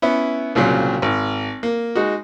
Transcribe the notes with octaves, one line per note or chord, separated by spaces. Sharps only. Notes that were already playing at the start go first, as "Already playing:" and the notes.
B3 C#4 E4
C2 A#2 C#3 F#3 C4
G#1
A#3
G#3 D#4 F#4